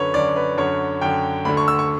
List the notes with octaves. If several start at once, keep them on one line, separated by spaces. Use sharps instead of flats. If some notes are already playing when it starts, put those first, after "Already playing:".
Already playing: F#2 D3 B4 C#5
F#2 D3 D5
B4
F#2 D3 C#5
F#2 D3 G5
D2 D3 B5
C#6
E6
C#6